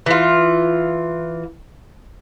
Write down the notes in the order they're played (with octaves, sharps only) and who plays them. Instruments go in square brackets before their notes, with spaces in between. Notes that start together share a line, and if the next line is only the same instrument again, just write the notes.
[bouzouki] E3 F4